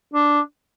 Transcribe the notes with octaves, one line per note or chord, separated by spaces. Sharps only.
D4